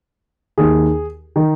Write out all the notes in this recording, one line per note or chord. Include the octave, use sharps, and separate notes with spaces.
D#2 D#3 G#4
D#3